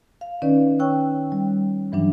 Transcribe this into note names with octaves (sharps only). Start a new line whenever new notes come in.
F5
D#3 C#4 D#4 B4 D5
C#5 G5 C#6 E6 F#6
G3
G2 E3 F#3 D4